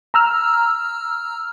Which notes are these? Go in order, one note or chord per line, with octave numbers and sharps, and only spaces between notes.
A#5 E6 F6